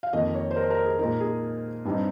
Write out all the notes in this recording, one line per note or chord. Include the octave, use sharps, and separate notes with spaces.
F5
F2 D#3 A#3 D#4 D#5
C#5
C5
A#4
C5
A#4
G#4
A#2 G#3 D#4 A#4
G#4
G2 G3 C4 D#4